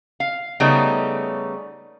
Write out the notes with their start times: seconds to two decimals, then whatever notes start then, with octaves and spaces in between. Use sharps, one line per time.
0.20 F5
0.60 C#3 G3 A3 B3 C#4 D#4